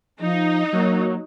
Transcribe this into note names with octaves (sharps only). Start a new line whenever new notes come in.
F3 D#4
F#3 A#3